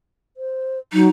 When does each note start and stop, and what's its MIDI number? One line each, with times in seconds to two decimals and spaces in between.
0.37 0.79 72
0.93 1.07 54
0.93 1.10 63